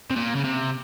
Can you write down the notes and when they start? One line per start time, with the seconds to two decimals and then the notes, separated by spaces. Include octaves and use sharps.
0.11 C3
0.16 A#2
0.36 C#3
0.44 C3